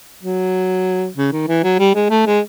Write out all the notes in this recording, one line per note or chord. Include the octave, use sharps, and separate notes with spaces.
F#3
C#3
D#3
E3
F#3
G3
G#3
A3
G#3